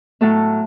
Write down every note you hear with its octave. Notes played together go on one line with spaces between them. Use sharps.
A2 F#3 A3 A4